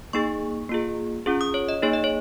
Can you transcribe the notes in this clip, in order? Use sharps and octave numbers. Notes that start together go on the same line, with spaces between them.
A#3 D#4 G#4 C#6
A#3 F4 G#4
C#4 F4 G#4
D#6
C#5
D#5
A#3 D#4 G#4 C#5
D#5
C#5